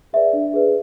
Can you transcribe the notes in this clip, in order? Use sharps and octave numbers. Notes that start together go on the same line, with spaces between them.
G#4 B4 D5 E5
D4
G#4 B4 D5